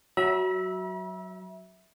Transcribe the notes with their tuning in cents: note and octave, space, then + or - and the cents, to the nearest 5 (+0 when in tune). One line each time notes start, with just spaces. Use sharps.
F#3 +5 E5 -10 B5 -45